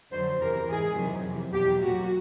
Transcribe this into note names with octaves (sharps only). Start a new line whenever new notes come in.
F2 D3 F#3 C5
E2 C3 E3 A#4
G#2 E3 G#4
E2 C3 D#3 F#3
F2 C3 E3
E2 B2 F#3 G4
A#2 F#3 F#4